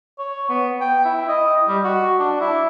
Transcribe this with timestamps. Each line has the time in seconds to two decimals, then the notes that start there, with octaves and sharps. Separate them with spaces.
0.19 C#5
0.49 B3
0.81 G5
1.05 E4
1.29 D#5
1.68 G3
1.84 F#4
2.19 D4
2.41 E4